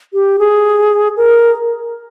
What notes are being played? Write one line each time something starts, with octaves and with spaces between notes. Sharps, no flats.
G4
G#4
A#4